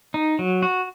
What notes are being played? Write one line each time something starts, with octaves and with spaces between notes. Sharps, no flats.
D#4
F#3
F#4